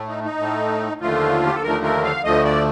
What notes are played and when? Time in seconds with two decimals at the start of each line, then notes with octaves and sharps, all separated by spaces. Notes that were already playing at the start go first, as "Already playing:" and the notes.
Already playing: A2 A3
0.08 D#4
0.24 D#4
0.39 A2 A3
1.01 D#2 D3 F3 A3 F4
1.47 G4
1.55 A4
1.62 D#2 D3 F3 A3 A#4
1.84 A#4
2.04 F5
2.24 D2 D3 F3 A3 D#5
2.45 D5